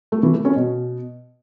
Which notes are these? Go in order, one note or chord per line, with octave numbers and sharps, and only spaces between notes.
A3
E3
A3
C#4
B2